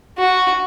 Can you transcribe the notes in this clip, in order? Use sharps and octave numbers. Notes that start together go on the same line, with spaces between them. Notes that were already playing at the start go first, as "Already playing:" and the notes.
F#4